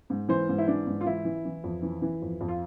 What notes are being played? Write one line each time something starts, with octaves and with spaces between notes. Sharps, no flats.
G#2
E3 C5
G#2
E4
E3 D4
G#2
F4
E3 E4
E3
E3
F2
E3
E3
F2
F2
F4